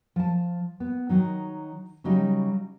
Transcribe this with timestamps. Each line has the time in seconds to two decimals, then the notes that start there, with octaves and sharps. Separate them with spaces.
0.16 F3 A5
0.80 B3
1.09 D#3 F#3 D#4
2.04 C#3 F#3 G3 D#4